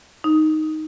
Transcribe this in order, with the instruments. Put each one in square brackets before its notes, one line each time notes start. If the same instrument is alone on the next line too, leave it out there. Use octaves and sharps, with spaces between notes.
[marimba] D#4